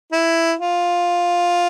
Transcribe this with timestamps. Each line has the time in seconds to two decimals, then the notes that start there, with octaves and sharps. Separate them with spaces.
0.12 E4
0.59 F4